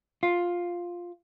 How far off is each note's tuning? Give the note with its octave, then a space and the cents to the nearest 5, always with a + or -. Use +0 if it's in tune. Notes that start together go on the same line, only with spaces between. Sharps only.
F4 +5